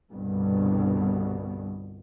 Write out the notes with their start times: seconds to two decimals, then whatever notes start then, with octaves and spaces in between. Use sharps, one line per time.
0.11 G1 C2 G2 B2